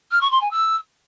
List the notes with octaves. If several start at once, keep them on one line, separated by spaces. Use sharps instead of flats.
F6
C#6
C6
G#5
E6